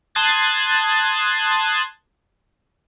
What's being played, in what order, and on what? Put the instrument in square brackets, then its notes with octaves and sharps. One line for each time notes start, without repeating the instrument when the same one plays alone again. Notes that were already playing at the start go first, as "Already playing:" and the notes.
[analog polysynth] A5 C6 D#6 F#6 G#6 A6